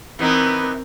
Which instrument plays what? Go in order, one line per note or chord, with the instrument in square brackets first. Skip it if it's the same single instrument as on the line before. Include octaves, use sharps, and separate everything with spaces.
[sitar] E3 B3 D#4 [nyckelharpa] C4 A#4